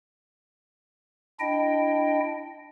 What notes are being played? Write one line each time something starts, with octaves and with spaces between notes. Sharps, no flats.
D4 E4 D#5 G5